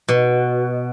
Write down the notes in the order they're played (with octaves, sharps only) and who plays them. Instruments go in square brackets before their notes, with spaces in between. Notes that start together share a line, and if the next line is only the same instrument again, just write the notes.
[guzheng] B2